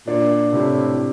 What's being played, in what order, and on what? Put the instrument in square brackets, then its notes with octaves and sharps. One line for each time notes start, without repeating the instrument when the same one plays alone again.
[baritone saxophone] A#2 [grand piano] D4
[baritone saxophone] A2 [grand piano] C3